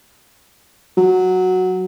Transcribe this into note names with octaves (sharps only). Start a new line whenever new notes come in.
F#3